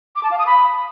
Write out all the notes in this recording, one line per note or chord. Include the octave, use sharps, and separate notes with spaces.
D6
A5
F5
D#6
B5